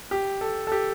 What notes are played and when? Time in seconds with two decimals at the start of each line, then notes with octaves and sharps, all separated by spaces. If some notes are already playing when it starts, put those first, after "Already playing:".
0.11 G4
0.41 A4
0.67 A4
0.72 G4